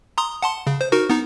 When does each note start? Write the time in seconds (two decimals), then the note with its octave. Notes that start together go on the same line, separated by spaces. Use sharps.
0.18 A#5 C6 D#6
0.42 F#5 A5 C6
0.67 C#3
0.81 C5
0.92 D#4 F#4 A#4
1.10 B3 D#4